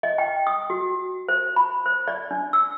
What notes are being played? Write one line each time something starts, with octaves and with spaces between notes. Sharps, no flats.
D#5
G5
D#6
F#4
C5
B5
C5
D5
D4
E6